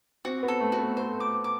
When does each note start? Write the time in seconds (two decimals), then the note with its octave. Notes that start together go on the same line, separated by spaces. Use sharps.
0.25 C4 F#4
0.43 B3
0.48 A4
0.60 A3
0.72 F#4
0.79 B3
0.97 A3 C5
1.20 D6
1.44 D6